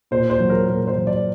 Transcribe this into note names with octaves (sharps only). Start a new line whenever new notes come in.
A#2 C5
C5
F#3
A#4
A#2 A#4
C5
F#3
D5